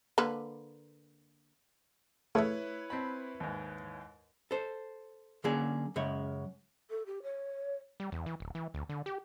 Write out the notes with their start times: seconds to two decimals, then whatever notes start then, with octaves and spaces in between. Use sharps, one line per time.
0.18 D3 A#3 B4
2.35 C#3 A3 E4 B4 C#5 E5
2.90 C4 A5 B5
3.40 D#2 G#2
4.51 A4 C5
5.44 D3 F#3 A#3 C#4 G#4 D5
5.96 F#2 C#3 G#3 C#5
6.90 A4
7.06 G4
7.23 C#5
8.00 G3
8.12 E2
8.26 E3
8.40 D1
8.55 E3
8.74 D2
8.89 D3
9.06 G4